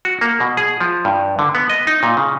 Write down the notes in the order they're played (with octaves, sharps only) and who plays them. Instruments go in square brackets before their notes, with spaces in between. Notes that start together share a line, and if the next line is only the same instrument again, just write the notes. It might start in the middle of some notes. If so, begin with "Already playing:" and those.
[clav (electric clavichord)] F#4
A#3
B2
G#4
F3
G2
D3
B3
D#5
D#4
A#2
C#3